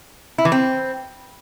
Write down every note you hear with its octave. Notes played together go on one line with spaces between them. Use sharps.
E4
E3
C4